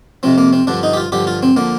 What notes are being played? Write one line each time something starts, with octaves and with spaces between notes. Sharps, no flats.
F2 C3 F3 C4
A#3
C4
G2 D3 F3 D4
D#4
G4
F4
G2 D3 F3 G4
F4
C4
D3 F3 A#3